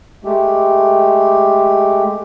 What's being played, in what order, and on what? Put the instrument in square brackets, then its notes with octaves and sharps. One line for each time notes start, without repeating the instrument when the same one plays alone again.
[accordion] G#3 A3 G4